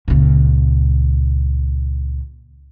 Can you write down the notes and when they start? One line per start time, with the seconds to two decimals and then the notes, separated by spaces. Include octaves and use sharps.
0.08 C#2 A#2